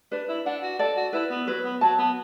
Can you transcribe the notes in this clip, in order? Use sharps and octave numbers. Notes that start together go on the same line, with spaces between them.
D4 B4
E4
D4 F#5
F#4
A4 D5
F#4
E4 B4
B3
F#3 B4
B3
F#3 A5
B3